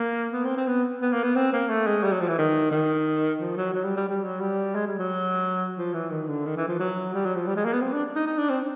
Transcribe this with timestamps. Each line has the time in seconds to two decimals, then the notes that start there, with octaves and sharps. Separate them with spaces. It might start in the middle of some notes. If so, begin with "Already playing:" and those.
Already playing: A#3
0.33 B3
0.45 C4
0.57 C4
0.68 B3
1.02 B3
1.13 A#3
1.23 B3
1.36 C4
1.53 A#3
1.69 A3
1.87 G#3
2.04 G3
2.12 F#3
2.21 F3
2.29 E3
2.38 D#3
2.72 D#3
3.40 F3
3.57 F#3
3.74 F#3
3.85 G3
3.97 G3
4.08 G3
4.24 F#3
4.41 G3
4.75 G#3
4.87 G3
4.99 F#3
5.78 F3
5.94 E3
6.11 D#3
6.28 D3
6.46 D#3
6.57 E3
6.68 F3
6.80 F#3
7.14 G3
7.26 F#3
7.36 F3
7.47 G3
7.56 G#3
7.65 A#3
7.73 B3
7.82 C4
7.93 D4
8.16 D#4
8.27 D#4
8.38 D4
8.50 C4